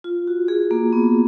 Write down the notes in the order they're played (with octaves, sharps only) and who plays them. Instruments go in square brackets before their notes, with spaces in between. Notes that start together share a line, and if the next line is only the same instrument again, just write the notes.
[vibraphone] F4
F#4
G#4
A#3
B3